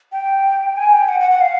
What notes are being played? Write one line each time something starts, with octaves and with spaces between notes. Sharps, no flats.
G5
G#5
G5
F#5
F#5
F#5
F5